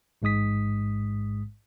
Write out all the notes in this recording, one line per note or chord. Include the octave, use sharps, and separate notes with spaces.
A1 G#2 G#3 D#6 B6